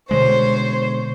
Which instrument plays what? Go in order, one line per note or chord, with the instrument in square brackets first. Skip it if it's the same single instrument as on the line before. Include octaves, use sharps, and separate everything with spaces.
[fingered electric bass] B2 D3 G#3 [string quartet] C5 C#5